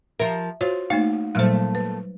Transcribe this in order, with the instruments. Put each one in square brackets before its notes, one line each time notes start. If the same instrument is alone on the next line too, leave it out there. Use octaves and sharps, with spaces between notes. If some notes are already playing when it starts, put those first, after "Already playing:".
[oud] F3 A#4 [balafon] E5
[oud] F4 [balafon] F#4 C5 C#5
[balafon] A3 A#3 D#4 [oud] F5
[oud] A#2 A3 [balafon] F#3 G3 C5
[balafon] B4